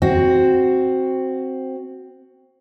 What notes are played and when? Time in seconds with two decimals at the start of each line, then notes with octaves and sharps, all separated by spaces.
0.02 C4 F#4